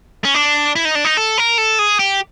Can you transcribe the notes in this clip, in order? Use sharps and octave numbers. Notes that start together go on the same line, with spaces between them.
C#4
D4
E4
D#4
D4
D#4
A4
A#4
A4
G#4
G4